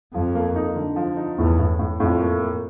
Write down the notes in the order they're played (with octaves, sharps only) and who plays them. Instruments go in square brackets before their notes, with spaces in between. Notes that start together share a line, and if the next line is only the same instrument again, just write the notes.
[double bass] F2 [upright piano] F3
[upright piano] A#3
D#4
D3
F3
D#4
[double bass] E2 [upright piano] A2
[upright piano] A2
A2
[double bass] F2 [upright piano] A2
[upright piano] A#3
A#3